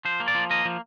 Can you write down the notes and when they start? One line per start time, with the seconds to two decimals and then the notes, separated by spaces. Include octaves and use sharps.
0.05 F3 C5
0.20 A#3
0.28 D5
0.35 F3
0.50 A#3 D#5
0.65 F3